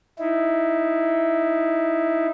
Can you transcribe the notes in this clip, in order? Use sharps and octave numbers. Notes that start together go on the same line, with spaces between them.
D#4 E4